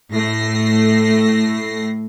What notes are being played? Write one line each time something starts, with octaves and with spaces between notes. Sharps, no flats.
A2 A3 A#6 C7